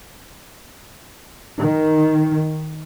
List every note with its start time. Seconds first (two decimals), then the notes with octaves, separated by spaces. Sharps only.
1.58 D#3